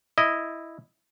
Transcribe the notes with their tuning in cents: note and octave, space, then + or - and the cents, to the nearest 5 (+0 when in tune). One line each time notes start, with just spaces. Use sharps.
E4 +0 D#5 +0